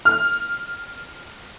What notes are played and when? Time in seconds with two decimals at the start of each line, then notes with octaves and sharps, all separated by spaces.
0.05 F6